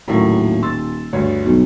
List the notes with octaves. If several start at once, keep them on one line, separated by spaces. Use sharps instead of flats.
D#1 A2 F#3 A#3
C6 E6 A6
D2 G2 C#5
B1